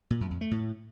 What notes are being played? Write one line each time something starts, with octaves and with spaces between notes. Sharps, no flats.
A#2
F#2
F2
A3
A2